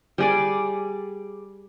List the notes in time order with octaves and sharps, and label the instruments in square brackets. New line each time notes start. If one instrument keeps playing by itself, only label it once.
[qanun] G3 G#4 D5